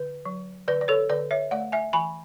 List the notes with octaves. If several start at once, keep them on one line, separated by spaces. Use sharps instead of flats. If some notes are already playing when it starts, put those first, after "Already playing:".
Already playing: D3 B4
F#3
D3 B4 D5
D5
A4 C#5
D3 B4 D5
C#5 E5
A3 D5 F#5
E5 G#5
E3 G#5 B5